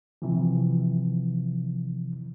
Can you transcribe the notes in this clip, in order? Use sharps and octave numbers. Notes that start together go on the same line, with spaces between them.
C3 E3 F3